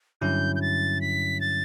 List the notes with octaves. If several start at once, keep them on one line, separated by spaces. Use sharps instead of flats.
G2 D3 F#3 C#4 E4 G6
G6
A6
B6
A6